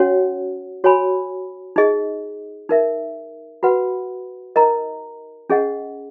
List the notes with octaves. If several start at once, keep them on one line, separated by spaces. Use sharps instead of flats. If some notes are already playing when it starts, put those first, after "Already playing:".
Already playing: C#4 F#4 C#5 F#5
F#4 C#5 G#5 B5
D#4 G#4 D#5
D#4 A#4 E5
F#4 B4 F#5 B5
D#4 A#4 D#5 A#5
C#4 G#4 D#5 F#5